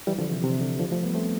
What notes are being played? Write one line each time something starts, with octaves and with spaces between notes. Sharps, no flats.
E3 G3
D3 F3
C3 E3
C3
D3
D3 F3
F3 A3
G3 B3
A3 C4